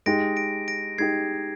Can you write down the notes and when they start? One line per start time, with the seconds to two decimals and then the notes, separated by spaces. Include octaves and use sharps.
0.06 G#3 D#4 G4 A#6 D7
0.36 A#6 D7
0.68 A#6 D7
0.98 G#3 D#4 G4 G#6 C7